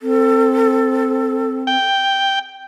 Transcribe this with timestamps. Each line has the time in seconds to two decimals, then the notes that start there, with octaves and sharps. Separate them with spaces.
0.02 C4 A4
1.67 G5